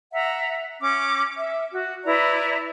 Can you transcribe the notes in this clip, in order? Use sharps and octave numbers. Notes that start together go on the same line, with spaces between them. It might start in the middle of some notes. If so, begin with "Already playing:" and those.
E5 F#5 A#5
C#4 D6
E5
F#4
E4 B4 D5 A#5